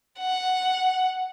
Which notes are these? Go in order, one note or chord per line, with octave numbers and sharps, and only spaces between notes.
F#5